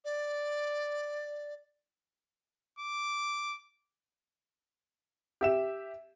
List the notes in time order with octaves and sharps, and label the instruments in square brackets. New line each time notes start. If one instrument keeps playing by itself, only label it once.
[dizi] D5
[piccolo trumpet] D6
[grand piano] G4 E5 E7